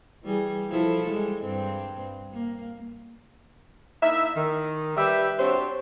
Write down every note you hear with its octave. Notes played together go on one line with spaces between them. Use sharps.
E3 G3 G#4
F3 E4 A4
G3 G#3
G2 C4
A#3
A#3 D#4 E4 E5
D#3
G3 G4 B4 E5
C4 D4 F#4 G4 C5 C#5